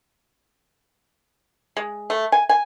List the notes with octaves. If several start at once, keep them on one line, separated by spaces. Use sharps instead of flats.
G#3
A3
G#5
G#5